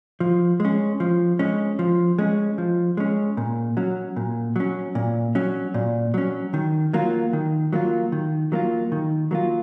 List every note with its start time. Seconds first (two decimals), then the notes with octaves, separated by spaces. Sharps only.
0.20 F3
0.60 G#3 C#4
1.00 F3
1.39 G#3 C#4
1.79 F3
2.18 G#3 C#4
2.58 F3
2.97 G#3 C#4
3.37 A#2
3.77 F#3 C#4
4.16 A#2
4.56 F#3 C#4
4.95 A#2
5.35 F#3 C#4
5.74 A#2
6.14 F#3 C#4
6.54 D#3
6.93 F#3 A#3 F4
7.33 D#3
7.73 F#3 A#3 F4
8.12 D#3
8.52 F#3 A#3 F4
8.92 D#3
9.31 F#3 A#3 F4